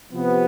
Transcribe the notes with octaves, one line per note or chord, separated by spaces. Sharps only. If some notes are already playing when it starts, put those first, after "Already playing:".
C3 F3 B3